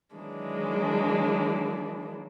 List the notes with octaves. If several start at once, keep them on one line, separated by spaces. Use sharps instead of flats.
D#3 E3 F#3 G#3 A#3 D4